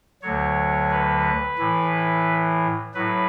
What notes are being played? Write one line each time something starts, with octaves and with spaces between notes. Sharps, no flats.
D2 D3 F#3 C#5
B4
A2 E3
A2 F#3 B4